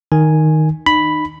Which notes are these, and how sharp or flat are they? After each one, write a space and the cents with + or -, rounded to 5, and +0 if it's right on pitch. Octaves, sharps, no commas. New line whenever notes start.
D#3 +0 G#5 +0
D#4 -30 B5 +0